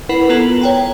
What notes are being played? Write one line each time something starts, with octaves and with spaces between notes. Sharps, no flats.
E4 A#4 B4 F#5 B5 C7
B3 F4 A4 A#5 G#6 F#7
C#5 G5 A#5